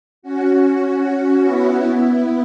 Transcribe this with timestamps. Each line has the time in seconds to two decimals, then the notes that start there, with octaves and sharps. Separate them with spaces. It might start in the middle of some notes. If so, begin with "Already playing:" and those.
0.22 C#4 F#4
1.02 C#4 F#4
1.42 B3 E4
1.81 B3 E4